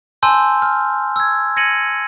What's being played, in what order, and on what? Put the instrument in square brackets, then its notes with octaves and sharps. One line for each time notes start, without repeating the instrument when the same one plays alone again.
[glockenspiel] G#5 A5 C6 E6 G6
F6
E6 G#6
G#6 A#6 C#7 D#7 F#7